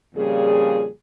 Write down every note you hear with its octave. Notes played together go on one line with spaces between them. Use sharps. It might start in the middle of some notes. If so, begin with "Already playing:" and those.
F2 A#2 C#3 G3 G#4